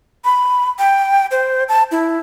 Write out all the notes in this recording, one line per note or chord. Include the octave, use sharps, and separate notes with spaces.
B5
G5
C5
A5
E4